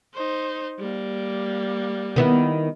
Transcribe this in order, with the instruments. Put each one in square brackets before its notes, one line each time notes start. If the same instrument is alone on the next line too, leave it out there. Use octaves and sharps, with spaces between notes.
[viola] D#4 C5
G3 A#3
[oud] D#3 B3 E4